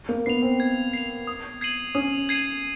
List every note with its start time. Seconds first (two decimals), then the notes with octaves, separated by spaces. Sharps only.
0.09 A#3
0.26 B3 C7
0.30 F7
0.43 C4
0.60 G#6
0.93 C7 F7
1.27 D#6
1.61 G#6 C7 D#7 F#7
1.95 C#4 D#6
2.29 G#6 C7 D#7 F#7